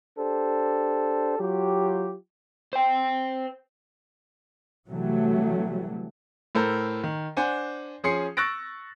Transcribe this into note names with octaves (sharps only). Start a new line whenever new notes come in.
D4 G4 A4 C5
F#3 F4 G4
C5 G5
C3 E3 F#3 G3 A3
A2 A4 A#4 C5
D#3
D4 C5 F#5 G#5
F3 C#4 G#4 C6 C7 C#7
C#6 E6 F#6 A6 A#6 D7